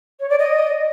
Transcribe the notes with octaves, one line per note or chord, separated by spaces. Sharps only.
C#5
D5
D#5